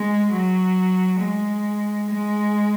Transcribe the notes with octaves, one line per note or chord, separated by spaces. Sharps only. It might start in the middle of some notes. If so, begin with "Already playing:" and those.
Already playing: G#3
F#3
G#3
G#3